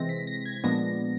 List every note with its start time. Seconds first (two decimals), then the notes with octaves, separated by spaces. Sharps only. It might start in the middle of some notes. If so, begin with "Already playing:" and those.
Already playing: C3 E3 G#3 C4 A#6
0.09 B6
0.27 A#6
0.45 G#6
0.64 A#2 F3 G#3 B3 D4 A#6